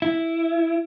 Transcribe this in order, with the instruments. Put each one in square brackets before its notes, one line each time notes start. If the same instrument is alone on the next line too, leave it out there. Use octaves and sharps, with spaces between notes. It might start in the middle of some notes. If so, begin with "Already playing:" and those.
[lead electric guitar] E4